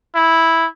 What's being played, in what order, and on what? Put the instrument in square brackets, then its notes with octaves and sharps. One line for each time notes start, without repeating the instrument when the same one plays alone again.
[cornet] E4